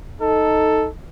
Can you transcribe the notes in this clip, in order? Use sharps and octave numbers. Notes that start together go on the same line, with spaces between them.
D#4 A4